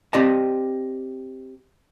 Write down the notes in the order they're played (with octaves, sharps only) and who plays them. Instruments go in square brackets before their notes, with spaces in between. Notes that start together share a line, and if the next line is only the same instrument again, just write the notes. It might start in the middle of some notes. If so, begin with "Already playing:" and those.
[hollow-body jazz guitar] C4 G4 D5 D#5 A5